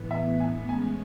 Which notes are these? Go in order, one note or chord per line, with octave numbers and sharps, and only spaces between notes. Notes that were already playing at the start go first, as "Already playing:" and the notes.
Already playing: A2 E3 B3
E5
G#5
A2 G#3 C#4 G#5